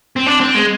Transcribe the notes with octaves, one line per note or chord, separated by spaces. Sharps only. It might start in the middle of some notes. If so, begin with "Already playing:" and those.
C4
D4
C4
G#3